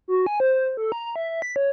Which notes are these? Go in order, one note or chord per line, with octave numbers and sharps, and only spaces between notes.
F#4
G#5
C5
A4
A#5
E5
B6
C#5